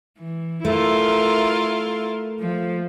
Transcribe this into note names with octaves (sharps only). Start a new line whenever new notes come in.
E3
A3 E4 F4 A#4
F3